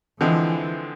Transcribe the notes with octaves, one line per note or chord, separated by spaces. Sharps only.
D3 E3 F3 G#3 C4